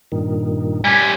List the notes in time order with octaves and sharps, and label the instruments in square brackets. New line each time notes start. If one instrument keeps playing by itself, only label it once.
[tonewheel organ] G2 A#2 D#3
[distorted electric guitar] G3 C#4 [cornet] G#5